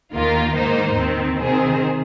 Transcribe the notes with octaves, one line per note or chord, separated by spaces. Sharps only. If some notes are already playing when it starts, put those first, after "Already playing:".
D#2 D#3 A#3 F4 A#4
G#2 D#3 A#3 D#4 C5
D#2 D#3 C4
C3 D#3 C4 G#4 C5